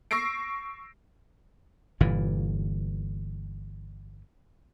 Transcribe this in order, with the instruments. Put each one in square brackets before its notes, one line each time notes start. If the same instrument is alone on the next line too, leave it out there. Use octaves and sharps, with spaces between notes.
[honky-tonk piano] C#6 E6 A#6 C7 D7
[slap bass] G1 A#2 E3